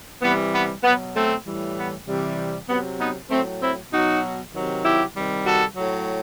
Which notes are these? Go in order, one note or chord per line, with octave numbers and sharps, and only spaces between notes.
C3 E3 G3 B3
B3
B2 F#3 B3
A3 C4
A2 E3 G3
B3
C3 E3 G3
C3 F#3 B3
B3 D#4
A2 F#3 A3 C4
C4 E4
B2 F#3 D#4 F#4
C3 D#3 F#3
E4 G4
C3 D#3 G3
F#4 A4
A2 F#3